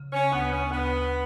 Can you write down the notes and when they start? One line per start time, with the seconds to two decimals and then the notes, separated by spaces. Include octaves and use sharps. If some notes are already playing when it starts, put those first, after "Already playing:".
Already playing: C#3
0.13 C#4
0.32 D2 B3
0.51 C#4
0.71 D2 B3